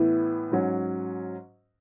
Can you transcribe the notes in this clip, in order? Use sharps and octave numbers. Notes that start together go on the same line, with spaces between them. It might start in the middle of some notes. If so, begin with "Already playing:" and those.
Already playing: A2 E3 B3 E4
G#2 F#3 C#4